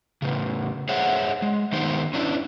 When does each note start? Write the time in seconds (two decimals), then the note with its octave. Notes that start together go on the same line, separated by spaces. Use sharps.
0.22 A2 C#3
0.89 G#4 C5 C#5 E5 F#5
1.42 G#3
1.72 D#3 B3 D#4 G4 C5
2.14 C#4 D4 E4